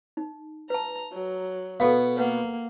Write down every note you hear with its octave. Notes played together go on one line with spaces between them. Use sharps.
D#4
B4 A5 A#5
F#3
B2 B3 A4 F5
A#3 B4 F#5